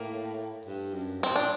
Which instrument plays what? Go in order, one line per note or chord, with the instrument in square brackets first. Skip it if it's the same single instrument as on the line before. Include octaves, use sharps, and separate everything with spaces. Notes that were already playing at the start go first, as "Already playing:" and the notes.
Already playing: [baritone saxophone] A2 [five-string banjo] A#3
[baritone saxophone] G2
F#2
[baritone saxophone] G2 [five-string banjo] C4
[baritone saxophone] C3
[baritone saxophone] A#2 [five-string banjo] D4